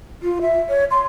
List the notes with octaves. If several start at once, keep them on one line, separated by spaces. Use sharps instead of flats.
F4
E5
C#5
C6